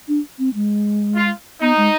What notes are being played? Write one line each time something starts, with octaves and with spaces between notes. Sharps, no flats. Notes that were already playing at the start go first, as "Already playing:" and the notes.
D4
C4
G#3
F4
B3 D#4
G#3